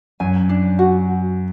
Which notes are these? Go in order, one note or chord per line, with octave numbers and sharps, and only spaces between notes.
F#2 G#5
D4
F#4